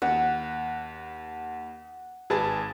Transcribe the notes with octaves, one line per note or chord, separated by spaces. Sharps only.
D#2 F#5
G#1 G#4 B4 G#5 A5 A6